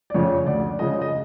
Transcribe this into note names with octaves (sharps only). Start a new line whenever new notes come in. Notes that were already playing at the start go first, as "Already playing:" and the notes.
D5
F2 C#3 F3 C#5
D2 D5
C#3 F3 G#3 D#5
D#5